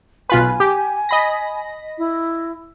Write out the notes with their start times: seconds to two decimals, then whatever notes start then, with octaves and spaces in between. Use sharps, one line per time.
0.30 B1 F4 B4 G#5
0.60 G4
1.09 D#5 B5 A#6
1.98 E4